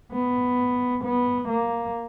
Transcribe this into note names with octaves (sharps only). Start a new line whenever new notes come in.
B3
B3
A#3